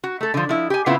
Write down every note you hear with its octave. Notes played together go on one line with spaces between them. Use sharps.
F#4
A3 A4
D3 F3
F3 E4
G4 G#5
A2 C#3 B3 C4 E4 F4